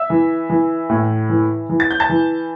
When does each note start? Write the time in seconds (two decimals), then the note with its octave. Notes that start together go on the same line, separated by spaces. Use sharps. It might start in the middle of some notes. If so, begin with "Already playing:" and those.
Already playing: E5 E6
0.10 E3
0.50 E3
0.89 A2
1.30 E3
1.70 E3
1.80 A6
1.91 G6
2.00 A5 A6
2.10 E3